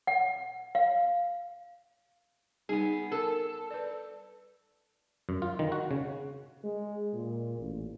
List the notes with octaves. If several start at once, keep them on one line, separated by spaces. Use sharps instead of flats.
F#5
F5
G3 B3 D#4 G#4
A4 A#4
B4 D5
F#2
F4
D#3
F#4
C#3
G#3
A#2
A1